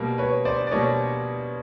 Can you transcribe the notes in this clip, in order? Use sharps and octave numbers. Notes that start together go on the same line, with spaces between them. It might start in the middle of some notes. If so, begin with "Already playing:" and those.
Already playing: B2 G3 A#3
B4 C#5
C5 D5
D5
B2 G3 A#3 C#5 D#5